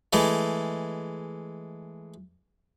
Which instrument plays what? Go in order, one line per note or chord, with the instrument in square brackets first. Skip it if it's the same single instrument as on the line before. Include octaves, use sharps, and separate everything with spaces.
[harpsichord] E3 G#3 A3